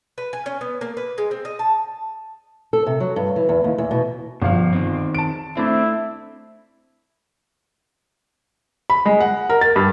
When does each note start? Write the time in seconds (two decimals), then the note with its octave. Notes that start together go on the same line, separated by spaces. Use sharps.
0.18 B4
0.33 G#5
0.46 C#4
0.61 B3
0.81 A#3
0.97 B4
1.18 G#3
1.31 C4
1.45 D#5
1.59 A5
2.73 A4
2.87 C3
3.00 F#3
3.16 G2
3.36 E3
3.49 E2
3.64 D#2
3.78 E2
3.91 B2
4.42 G1 B2 F3 F5
4.73 D#3 C4
5.15 A5 D7
5.57 A3 C4 D4 E4
8.90 B5
9.06 G#3
9.21 F#5
9.50 A#4
9.61 A6
9.76 G2